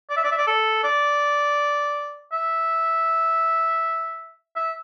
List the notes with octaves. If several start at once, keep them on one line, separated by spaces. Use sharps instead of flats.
D5
E5
D5
E5
D5
A4
D5
E5
E5